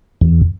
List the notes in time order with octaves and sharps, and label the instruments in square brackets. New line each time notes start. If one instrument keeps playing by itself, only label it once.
[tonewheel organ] E2